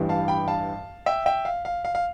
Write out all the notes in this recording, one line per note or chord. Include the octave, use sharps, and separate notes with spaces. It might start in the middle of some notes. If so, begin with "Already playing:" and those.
Already playing: A1 G2 E3 G3
F5 A5
G5 B5
F5 A5
E5 G5
E5 G5
F5
F5
F5
F5